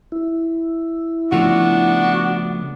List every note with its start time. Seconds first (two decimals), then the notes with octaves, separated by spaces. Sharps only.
0.12 E4
1.32 C#3 F3 A3 B3 D4 F#4